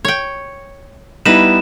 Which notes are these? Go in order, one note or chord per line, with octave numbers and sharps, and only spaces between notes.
C#5 G5
G3 B3 D#4 E4 B4 E7